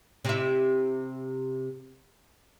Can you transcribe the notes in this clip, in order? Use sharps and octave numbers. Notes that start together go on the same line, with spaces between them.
C3 E4